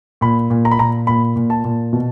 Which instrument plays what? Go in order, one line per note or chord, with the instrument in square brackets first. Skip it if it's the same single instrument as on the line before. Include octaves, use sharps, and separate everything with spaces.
[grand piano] A#2 B5
A#2
A#5
B5
A#2 A#5
A#2 B5
A#2
A5
A#2
B2